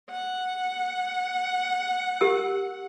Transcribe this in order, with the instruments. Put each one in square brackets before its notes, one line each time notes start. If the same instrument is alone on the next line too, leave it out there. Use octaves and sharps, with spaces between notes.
[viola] F#5
[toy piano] G4 A#4 E6